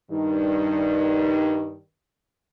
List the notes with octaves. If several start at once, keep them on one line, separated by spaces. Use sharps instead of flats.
G2 D#3